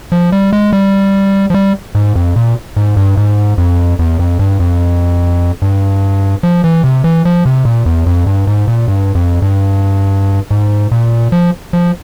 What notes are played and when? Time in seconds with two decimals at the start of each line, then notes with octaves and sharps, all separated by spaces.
0.12 F3
0.32 G3
0.53 G#3
0.73 G3
1.50 F3
1.54 G3
1.95 G#2
2.16 F2
2.36 A#2
2.77 G#2
2.97 G2
3.17 G#2
3.58 F2
3.99 E2
4.19 F2
4.39 G2
4.60 F2
5.62 G2
6.43 F3
6.64 E3
6.84 C3
7.04 E3
7.25 F3
7.46 C3
7.65 A#2
7.86 E2
8.06 F2
8.27 G2
8.47 G#2
8.68 A#2
8.88 G2
9.15 F2
9.42 G2
10.51 G#2
10.92 A#2
11.32 F3
11.73 F3